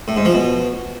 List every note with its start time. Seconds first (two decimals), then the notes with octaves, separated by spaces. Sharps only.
0.08 A2
0.17 G#2
0.25 F3
0.34 B2